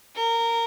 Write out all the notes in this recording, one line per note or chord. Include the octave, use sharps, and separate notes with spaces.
A#4